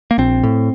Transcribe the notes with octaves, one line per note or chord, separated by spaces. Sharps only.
A#3
A#1 C4
A2